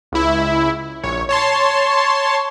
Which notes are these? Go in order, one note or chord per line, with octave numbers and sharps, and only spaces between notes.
C#2 E4
A#1 C#5
C#5 A5 C6